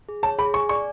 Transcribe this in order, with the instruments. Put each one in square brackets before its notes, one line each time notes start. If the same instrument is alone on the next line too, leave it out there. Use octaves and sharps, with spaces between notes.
[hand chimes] G#4
[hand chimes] C#5 [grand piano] A5
[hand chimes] G#4 [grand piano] B5
[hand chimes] G#5 [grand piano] C#6
[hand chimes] D5 [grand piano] C#6